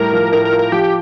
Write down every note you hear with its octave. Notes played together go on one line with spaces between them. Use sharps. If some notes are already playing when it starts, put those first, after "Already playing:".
Already playing: A2 G3 A#4
F3
A2 A#4
A#4
F4
A#4
F3 G4